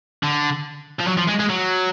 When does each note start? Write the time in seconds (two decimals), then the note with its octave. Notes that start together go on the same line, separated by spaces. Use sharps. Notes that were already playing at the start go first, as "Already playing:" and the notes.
0.23 D3
1.00 F3
1.08 F#3
1.19 F3
1.29 G#3
1.40 G#3
1.50 F#3